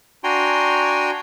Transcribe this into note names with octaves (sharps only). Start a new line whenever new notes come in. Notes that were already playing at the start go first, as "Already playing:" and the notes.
D4 F#4 G5 G#5 A#5 C6